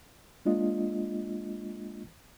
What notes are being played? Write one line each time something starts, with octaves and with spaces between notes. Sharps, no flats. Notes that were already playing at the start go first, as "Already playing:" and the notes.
G#3 A#3 D4 F4 D#5